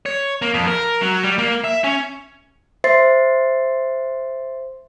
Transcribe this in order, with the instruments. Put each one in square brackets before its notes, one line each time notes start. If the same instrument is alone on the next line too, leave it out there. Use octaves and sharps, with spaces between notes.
[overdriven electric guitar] C#5
A#3
F2
A#4
F#3
G3
A#3
E5
C#4
[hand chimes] C5 E5 C6 A6 C7